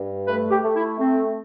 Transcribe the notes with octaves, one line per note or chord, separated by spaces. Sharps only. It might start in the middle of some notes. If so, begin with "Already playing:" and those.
Already playing: G2
A3 B4
G4
A3
E4
A3 C4